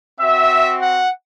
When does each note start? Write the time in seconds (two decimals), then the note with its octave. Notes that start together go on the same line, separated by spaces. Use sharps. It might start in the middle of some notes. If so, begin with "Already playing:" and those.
0.19 C4 F#4 E5
0.80 F#5